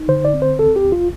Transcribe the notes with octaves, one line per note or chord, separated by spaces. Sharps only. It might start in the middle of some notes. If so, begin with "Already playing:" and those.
Already playing: D#4
D3 C5
D5
C4
C5
D2 A4
G4
D2
F4